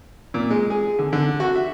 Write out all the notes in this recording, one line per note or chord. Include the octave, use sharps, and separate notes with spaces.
A#2
G#3
G#4
D3
D3
F#4
E5